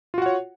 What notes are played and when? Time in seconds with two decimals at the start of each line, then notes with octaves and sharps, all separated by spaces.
0.14 F4
0.18 F#4
0.22 F#5
0.26 C#5